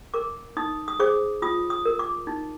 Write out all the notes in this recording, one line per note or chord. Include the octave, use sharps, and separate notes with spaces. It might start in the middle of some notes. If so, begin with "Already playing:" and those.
A#4 D6
D#4 D#6
D#6
G#4 C5 D6
F4 D#6
D#6
A#4
D6
D#4